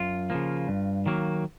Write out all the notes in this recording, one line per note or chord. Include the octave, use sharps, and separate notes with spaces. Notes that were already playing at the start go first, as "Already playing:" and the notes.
Already playing: F#2 F4
C#3 F3 A#3
G2
D#3 F#3 A#3